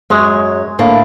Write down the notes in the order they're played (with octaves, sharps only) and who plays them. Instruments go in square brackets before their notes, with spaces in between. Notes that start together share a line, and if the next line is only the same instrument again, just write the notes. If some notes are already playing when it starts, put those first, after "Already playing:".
[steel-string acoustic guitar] F#2 C#5 [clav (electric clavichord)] G#3
[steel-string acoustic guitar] A2 D3 A#3